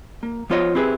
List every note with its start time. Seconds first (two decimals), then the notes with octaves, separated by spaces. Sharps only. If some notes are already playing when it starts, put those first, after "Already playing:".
0.23 A#3
0.50 F3 B3 F4 C5 C#5 D#5
0.75 C4 E4 G4 G#4 B4